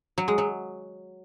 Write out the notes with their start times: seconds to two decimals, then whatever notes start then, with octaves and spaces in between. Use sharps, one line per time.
0.18 F#3
0.28 G#3
0.38 F#3